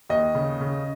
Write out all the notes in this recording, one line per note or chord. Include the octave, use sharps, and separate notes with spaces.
D#2 D#5
C#3
C#3